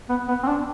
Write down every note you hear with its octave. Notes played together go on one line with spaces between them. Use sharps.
B3
B3
C4
D4